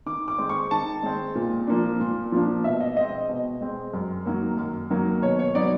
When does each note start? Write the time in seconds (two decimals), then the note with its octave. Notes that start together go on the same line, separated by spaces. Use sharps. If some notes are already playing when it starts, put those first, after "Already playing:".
0.06 D#3 D6
0.28 D6
0.38 G#3 C4
0.49 C#6
0.71 D#3 A5
1.03 G#3 C4
1.35 A#2
1.67 F3 A#3 D4
2.00 A#2
2.32 F3 A#3 D4
2.64 B2 E5
2.80 D#5
2.97 G#3 C4 D#5
3.29 B2
3.61 G#3 C4
3.93 F#2
4.26 D#3 F#3 A#3
4.57 F#2
4.90 D#3 F#3 A#3
5.22 B2 C#5
5.39 C#5
5.55 F#3 B3 D#4 D5